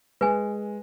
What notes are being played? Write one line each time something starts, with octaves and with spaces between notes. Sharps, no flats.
G#3 B4 G#5